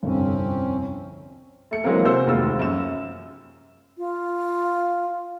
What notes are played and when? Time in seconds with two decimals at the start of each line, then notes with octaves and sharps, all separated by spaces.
0.03 G1 C2 F2 C4 C#4
1.71 A3 C#7
1.84 E3 F#3 G#3 A#3 C4 A#4
2.04 C3 F#4 G#4 C5 E6
2.27 F1 D#2 G#3 F4 E6
2.59 F#2 E7
3.98 F4